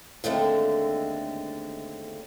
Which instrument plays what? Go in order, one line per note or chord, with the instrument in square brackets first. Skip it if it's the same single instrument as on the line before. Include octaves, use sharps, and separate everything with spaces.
[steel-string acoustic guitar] D#2 D3 G#3 A3 C4 A4